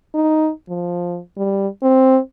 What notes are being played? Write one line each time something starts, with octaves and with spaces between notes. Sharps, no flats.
D#4
F3
G3
C4